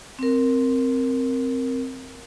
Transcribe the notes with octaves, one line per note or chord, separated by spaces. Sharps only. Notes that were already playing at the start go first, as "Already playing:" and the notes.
C4 A#4